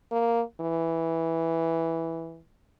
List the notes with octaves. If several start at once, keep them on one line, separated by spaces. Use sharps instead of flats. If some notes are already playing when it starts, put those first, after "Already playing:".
A#3
E3